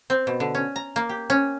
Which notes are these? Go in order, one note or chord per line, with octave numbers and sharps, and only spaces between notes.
C4
B2
D3
C#4
A#5
A#3
G4
C#4